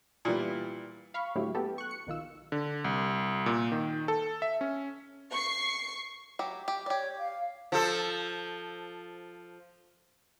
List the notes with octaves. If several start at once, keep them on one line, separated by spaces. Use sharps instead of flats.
A#2 E3 G3
F5 B5 C#6
A2 D3 F#3 E4 G4
B3 G4 A4
C#6 F#6
C#7
B1 D#3 F4 E6
D3
C2
A#2
D#3
A4
E5
C#4
C#6 C7
F#3 G4
G4
G4 C#5 D5
F5
F3 A4